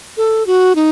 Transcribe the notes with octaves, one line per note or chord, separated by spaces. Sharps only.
A4
F#4
D#4